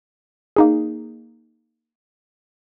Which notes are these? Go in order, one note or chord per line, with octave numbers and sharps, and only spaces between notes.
A#3 D#4 G#4